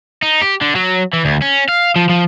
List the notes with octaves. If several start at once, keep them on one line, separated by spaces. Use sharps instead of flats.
D#4
G4
D3
F#3
E3
D2
C#4
F5
F3
F3